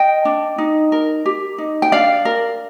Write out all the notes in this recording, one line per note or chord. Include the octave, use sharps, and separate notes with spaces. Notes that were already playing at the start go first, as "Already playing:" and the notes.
Already playing: D#5 G5
D4
D#4
A#4
G4
D#4
G5
D4 D5 F5
A#4